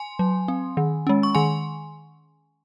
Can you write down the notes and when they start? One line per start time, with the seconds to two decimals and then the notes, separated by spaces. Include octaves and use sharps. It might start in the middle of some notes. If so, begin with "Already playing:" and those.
Already playing: G#5 C6
0.19 F#3
0.48 C4
0.77 D#3
1.07 G#3 C#4
1.23 C#6
1.35 D#3 G#5 C6